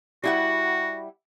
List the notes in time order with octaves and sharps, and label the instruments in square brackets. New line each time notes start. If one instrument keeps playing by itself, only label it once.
[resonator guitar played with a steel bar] G3 E4 F#5 [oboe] F#4